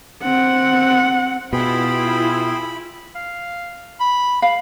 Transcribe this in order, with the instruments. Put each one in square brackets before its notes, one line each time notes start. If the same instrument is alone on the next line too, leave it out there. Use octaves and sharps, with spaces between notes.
[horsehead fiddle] C4 F#5
[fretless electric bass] B2 [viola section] E4 F4 [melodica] G#4 G5 C6 [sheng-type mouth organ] B5
[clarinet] F5
B5
[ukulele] F5 [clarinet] B5